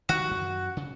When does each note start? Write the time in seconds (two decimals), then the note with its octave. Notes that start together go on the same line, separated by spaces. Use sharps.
0.09 D#3 F3 G3 F#4
0.31 F#2
0.77 C#3